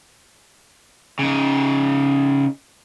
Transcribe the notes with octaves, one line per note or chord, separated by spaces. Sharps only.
C#3 D#4